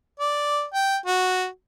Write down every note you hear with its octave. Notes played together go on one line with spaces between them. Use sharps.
D5
G5
F#4